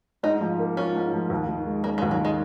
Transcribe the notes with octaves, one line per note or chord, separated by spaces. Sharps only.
G#2 D#4
F3
A#3
C#4 F4
G#2
F3
D#2
D#3
G#3
A#3 C#4
G#3
D#2
F#3
D#3 G#3